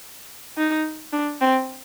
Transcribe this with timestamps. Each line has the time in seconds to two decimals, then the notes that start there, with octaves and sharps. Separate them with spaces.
0.57 D#4
1.13 D4
1.41 C4